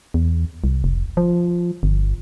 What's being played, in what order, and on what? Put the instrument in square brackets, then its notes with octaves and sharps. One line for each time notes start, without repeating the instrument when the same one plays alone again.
[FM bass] E2
C2
F1
F3
G1